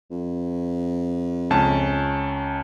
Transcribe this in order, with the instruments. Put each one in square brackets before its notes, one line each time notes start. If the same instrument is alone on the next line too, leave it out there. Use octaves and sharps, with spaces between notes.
[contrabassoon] F2
[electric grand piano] C#2 C#4 A5